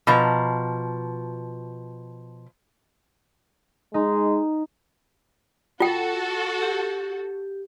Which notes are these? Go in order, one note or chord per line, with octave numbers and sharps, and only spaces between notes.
B2 F3 A#5
G#3 D#4
F4 F#4 A4 G5
G4